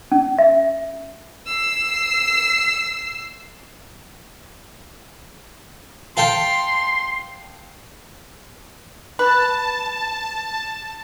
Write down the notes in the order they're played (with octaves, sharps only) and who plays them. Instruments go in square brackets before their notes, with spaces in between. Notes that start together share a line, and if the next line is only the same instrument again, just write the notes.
[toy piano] C#4
E5
[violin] E6 C7
[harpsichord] A4 F5 G5 [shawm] C6
[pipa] B4 [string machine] A5